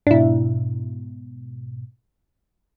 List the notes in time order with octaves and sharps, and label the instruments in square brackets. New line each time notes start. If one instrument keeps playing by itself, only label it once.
[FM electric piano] G#2 B2 [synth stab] D4 E4